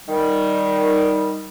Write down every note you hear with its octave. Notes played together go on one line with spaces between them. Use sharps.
D#3 G3